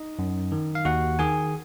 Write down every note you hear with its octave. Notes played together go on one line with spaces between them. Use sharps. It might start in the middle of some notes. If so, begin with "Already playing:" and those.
Already playing: D#4 D#5
F#2
D#3
F5
D#2 F#4 F#5
D#3 G#4 G#5